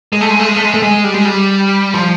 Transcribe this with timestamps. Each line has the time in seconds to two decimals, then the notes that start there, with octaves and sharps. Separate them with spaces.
0.13 G#3
0.21 A3
0.30 G#3
0.39 A3
0.47 G#3
0.56 A3
0.64 G#3
0.74 A3
0.82 G#3
1.04 G3
1.14 G#3
1.25 G3
1.94 F3